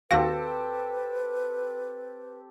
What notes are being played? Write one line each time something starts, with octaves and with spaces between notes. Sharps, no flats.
D#2 C4 F#4 G4 A4 B4 F5 A#6